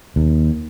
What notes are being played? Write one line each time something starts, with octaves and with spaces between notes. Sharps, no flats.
D#2